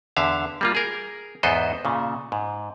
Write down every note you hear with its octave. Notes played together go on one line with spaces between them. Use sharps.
E2 D3 E5 F5
G3 A#3 F4
G#4 A#4
E2 G#2 B3 A4 C5 D#5
A#2 C#3
G#2